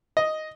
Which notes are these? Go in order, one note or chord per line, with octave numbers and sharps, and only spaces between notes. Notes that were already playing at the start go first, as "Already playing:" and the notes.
D#5